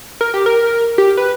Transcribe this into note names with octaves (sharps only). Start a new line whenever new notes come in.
A#4
G4
A#4
G4
B4